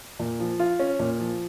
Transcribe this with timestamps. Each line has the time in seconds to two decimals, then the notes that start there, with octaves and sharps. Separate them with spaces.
0.19 A#2
0.40 F3
0.60 F4
0.79 C#4
0.99 A#2
1.19 F3